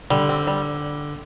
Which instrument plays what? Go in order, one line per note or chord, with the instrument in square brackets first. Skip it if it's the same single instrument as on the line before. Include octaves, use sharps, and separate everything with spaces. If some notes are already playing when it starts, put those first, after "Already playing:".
[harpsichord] D3 [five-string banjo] G3
[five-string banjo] C4
G3